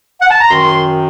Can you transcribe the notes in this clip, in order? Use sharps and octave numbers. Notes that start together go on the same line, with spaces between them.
F#5
A5
A#5
F#2 D#3 C6